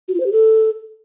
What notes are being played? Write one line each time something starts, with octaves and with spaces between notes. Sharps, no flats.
F#4
F4
C5
G4
A4